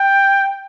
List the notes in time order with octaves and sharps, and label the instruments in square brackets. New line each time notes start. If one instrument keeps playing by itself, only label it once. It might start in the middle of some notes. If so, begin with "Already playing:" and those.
Already playing: [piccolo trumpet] G5